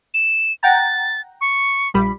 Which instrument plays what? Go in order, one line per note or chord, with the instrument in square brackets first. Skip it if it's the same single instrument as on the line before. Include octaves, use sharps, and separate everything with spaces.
[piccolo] E7
[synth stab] F#5 G5 A#5 [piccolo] A6
[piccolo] C#6
[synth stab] A#1 G3 B5